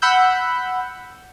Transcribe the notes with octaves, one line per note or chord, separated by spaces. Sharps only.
F#5 B5 E6 G6